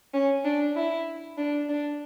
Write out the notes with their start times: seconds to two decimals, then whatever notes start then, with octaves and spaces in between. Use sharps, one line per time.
0.14 C#4
0.45 D4
0.76 E4
1.37 D4
1.69 D4